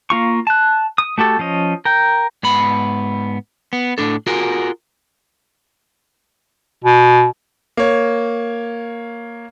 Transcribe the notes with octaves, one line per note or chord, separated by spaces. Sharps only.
A#3 F4 C#6
A5 F#6
D#6
A3 F#4 G4 A4
F3 C#4 D#5
A#4 G5
G#2 B3 B5
B3
A2 D4 A4
F4 F#4 G#4 A#4
B2
A#3 C#5